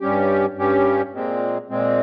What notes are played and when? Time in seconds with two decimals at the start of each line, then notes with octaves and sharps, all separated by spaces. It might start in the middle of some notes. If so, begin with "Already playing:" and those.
0.01 G2 G3 C#4 G4
0.57 G2 G3 C#4 G4
1.13 A#2 G#3 C4
1.70 A#2 G#3 C4